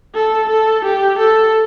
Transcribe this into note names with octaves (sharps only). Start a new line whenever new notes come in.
A4
A4
G4
A4